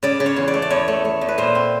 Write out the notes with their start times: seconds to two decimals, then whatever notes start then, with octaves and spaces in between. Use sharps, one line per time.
0.03 C#3 D5
0.20 C#3
0.26 C#5
0.36 E2
0.48 D5
0.54 A3
0.62 D5
0.70 E2 C#5
0.88 A3
1.05 A3
1.21 E2
1.28 B4
1.38 A#2 C5
1.55 C4